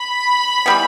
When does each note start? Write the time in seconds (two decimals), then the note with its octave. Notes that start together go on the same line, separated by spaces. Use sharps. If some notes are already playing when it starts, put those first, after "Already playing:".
Already playing: B5
0.66 E3 G3 B3